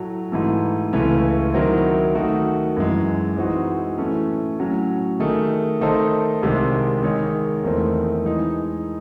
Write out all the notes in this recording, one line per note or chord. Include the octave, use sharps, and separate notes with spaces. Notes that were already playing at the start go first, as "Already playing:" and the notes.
Already playing: A2 F#3 A3
G#2 E3 A3
C#2 C#3 E3 A3 C#4
D#3 F#3 C4 E4
D#3 A3 D#4 F#4
F#2 E3 G#3
E3 G#3 C4 D#4 F#4
A2 E3 A3 C#4
A2 F#3 C#4
D#3 A3 D#4 G#4
D#3 A3 D#4 A4 C5
C2 C3 D#3 G#3 C4
D#3 G#3 D#4 G#4 C#5
E2 D#3 A3 C4
E3 G#3 D#4